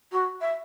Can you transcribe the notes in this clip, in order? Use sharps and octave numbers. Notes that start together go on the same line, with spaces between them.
F#4
E5